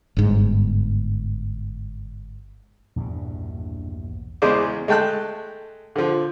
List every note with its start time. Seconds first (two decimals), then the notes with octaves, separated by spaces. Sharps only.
0.17 G1 G#2
2.96 A#1 E2 G2 B2
4.42 E2 C#3 G#3 C5 D5 D6
4.88 G#3 A3 G5 A5 F#6
5.96 D3 F3